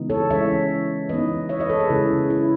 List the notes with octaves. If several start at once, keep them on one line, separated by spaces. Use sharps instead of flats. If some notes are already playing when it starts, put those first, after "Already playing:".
Already playing: C#3 E3 G#3 B3 D#4
A4 C#5
E3 G#3 C#4 C#5 E5
E3 B3 D#4 B4 D#5
C#5 E5
B4 D#5
A4 C#5
G#4 B4
C#3 G#3 C#4 E4
E4